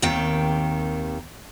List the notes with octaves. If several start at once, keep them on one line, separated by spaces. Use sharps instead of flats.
D#2 C3 D#3 G5